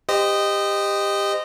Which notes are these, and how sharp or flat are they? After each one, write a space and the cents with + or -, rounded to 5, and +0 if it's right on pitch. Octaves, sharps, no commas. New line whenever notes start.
G4 +20 C5 -25 D#5 -10